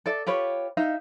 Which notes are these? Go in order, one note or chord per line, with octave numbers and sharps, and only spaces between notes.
A4 D5 E5
F4 G4 B4 C#5
D#4 E5 F5